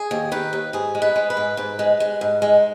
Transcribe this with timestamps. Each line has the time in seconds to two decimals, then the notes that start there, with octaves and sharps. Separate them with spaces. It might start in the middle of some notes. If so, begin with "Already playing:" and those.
Already playing: G#4
0.11 D#2
0.32 D#3 B4
0.53 D#2
0.73 G#2 G#4
0.95 G#3
1.02 B4
1.16 G#3
1.30 B4
1.37 G#2
1.57 G#2 B4
1.79 G#3
2.00 G#3
2.21 G#2
2.42 G#3